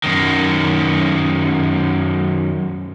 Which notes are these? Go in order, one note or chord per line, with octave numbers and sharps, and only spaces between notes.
F#2 D#3